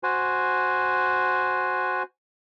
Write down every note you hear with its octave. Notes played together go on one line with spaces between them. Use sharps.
F#4 C5 G#5